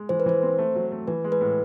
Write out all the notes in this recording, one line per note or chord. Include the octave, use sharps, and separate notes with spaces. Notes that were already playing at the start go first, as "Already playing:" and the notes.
Already playing: G#3
E3 C5
B4
E3 C5
C4
A3
F#3
A3
E3 B4
G#3
B4
A2